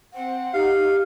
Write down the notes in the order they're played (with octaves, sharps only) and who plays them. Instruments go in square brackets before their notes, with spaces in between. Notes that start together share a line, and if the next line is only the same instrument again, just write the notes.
[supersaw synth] C4 [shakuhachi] F#5
[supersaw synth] D#4 [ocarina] G4 [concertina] F5